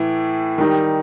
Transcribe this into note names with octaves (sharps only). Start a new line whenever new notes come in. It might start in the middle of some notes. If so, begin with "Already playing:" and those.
Already playing: A2 E3
D#3 G3 D#4